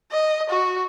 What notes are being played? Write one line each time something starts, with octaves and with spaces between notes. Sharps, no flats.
D#5
F#4